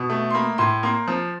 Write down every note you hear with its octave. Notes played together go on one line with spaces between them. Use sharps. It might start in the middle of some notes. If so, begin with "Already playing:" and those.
Already playing: B2
A3
C6
A#3 B5
A2 C6
A#3 C6
F3